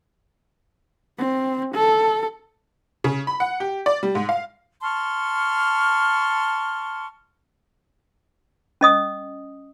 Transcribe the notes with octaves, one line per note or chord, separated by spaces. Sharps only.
C4
A4
C#3
B5
F#5
G4
D5
G3
G#2
F5
A5 C6 C#6 F6
C#4 D#5 D#6